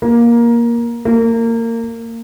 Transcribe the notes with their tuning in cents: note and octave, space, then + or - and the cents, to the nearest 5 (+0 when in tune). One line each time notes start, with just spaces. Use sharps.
A#3 +15
A#3 -25